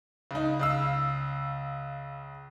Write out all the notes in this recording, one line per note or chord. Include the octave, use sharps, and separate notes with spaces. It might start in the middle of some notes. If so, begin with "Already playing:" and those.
C#2 D#4
C#2 F5 E6